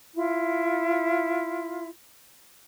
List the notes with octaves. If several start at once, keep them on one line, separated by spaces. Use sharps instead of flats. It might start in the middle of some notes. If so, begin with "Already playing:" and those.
E4 F4